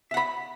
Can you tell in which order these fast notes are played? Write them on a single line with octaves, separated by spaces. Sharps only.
E5 F#5 B5